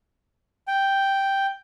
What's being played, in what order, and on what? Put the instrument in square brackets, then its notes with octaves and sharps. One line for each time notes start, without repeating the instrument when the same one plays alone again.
[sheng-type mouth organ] G5